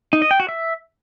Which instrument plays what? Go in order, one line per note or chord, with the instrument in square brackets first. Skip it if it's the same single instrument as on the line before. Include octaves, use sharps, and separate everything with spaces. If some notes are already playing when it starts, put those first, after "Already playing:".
[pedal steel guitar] D#4
D#5
G5
F#4
E5